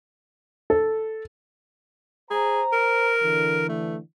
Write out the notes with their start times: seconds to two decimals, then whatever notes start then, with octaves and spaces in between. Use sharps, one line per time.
0.70 A4
2.31 G#4 C5 A#5
2.73 A#4
3.23 D3 E3
3.69 A3